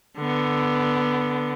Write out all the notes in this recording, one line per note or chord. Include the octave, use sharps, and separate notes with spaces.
D3 B3